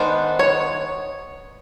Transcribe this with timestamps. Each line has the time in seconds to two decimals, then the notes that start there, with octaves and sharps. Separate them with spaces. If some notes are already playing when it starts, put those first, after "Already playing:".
Already playing: D#3 G#3 B3 D4 C5
0.39 C#5